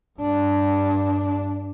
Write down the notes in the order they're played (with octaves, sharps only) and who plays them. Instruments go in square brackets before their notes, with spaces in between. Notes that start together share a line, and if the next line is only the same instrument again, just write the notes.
[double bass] G2 D4